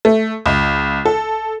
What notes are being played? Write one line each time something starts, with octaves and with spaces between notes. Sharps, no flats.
A3
C#2
A4